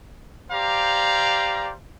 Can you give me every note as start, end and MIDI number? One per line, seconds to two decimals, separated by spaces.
0.52 1.72 67
0.52 1.72 72
0.52 1.72 74
0.52 1.72 77
0.52 1.72 82